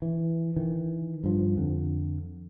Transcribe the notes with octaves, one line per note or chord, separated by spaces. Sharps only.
E3
D#3 E3
G2 F3
F2 D3